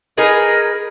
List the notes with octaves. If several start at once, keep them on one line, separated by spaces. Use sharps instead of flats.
D#4 G#4 A#4 B4